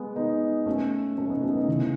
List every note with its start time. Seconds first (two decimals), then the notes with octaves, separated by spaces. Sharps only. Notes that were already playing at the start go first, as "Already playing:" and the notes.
Already playing: G#3 B3
0.16 B3 D#4
0.66 A3 C#4
1.18 A3 C#4
1.30 B3 D#4
1.43 A3 C#4
1.55 B3 D#4
1.68 C#3 E3